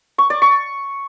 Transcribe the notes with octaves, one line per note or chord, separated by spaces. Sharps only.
C#6
D5
C#6